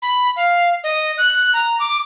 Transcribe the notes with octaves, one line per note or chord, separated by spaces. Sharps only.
B5
F5
D#5
F#6
A#5
D6